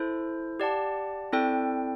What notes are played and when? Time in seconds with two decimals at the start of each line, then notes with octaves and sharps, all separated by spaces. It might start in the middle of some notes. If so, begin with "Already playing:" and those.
Already playing: E4 A4 C5
0.60 G4 D5 F#5 A5
1.32 C4 E4 A4 D5 G5